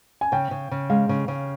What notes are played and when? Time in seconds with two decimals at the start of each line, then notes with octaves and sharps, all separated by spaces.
0.21 G#5
0.32 C#3 G5
0.51 C#3
0.71 C#3
0.90 G#3 F5
1.09 C#3
1.28 C#3